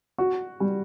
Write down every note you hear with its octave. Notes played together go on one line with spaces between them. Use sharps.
F#4
G3